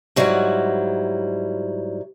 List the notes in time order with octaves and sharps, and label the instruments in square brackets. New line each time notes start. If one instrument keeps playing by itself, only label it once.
[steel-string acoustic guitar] G#2 F#3 G3 E4 G#4 F#5